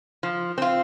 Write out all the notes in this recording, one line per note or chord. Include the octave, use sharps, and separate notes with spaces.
F3
C4 F4